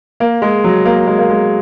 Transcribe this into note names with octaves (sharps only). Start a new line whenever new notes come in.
A#3
G#3
F#3
A#3
G#3
A#3
G#3